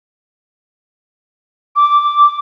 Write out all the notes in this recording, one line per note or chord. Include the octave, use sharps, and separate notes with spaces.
D6